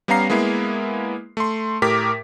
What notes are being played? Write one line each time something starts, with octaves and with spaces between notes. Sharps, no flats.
G3 B3 C#4 F5 A#5 C7
G#3 A#3 B3 E4
A3 C6
A2 G4 A#4 D6 B6